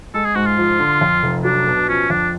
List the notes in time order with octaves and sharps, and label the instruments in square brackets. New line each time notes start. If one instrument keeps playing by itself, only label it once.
[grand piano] G#3 [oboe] A4
[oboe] G#4
[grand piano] G#2 [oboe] F#4
[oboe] F4
[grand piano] F3
D3
F2
F1
[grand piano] F#3 [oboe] D4
[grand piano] B2
[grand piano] F3 [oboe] C#4
[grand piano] F2 [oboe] D4